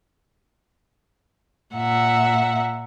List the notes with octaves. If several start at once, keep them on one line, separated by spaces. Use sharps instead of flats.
A#2 E5 F#5 A#5